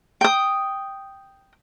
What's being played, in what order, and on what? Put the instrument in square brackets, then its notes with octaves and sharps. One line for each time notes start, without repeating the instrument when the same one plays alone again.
[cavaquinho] G5 D#6